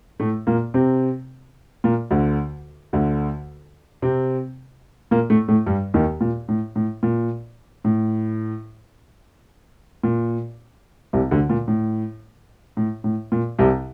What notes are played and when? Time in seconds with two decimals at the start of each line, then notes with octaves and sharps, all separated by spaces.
0.20 A2 A3
0.47 A#2 A#3
0.74 C3 C4
1.84 A#2 A#3
2.11 D2 D3
2.93 D2 D3
4.02 C3 C4
5.11 A#2 A#3
5.30 A2 A3
5.48 A2 A3
5.67 G2 G3
5.94 D#2 D#3
6.21 A#2
6.48 A2
6.76 A2
7.03 A#2
7.85 A2
10.04 A#2
11.13 C2 C3
11.31 D2 D3
11.50 A#2
11.68 A2
12.77 A2
13.04 A2
13.32 A#2
13.59 C2 C3